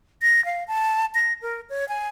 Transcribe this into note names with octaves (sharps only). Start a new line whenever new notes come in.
A#6
F5
A5
A#6
A#4
C#5
G#5